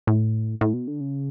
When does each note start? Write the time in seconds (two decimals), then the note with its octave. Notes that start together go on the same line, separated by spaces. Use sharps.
0.07 A2
0.61 A2
0.74 B2
0.88 D3
1.01 C#3